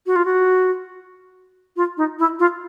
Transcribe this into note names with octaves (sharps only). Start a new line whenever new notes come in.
F#4
F4
F#4
F4
D#4
E4
F4